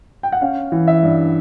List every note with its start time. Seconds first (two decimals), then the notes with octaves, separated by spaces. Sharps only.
0.23 G5
0.32 F#5
0.41 C#4 F5
0.72 E3
0.88 E5
1.03 G2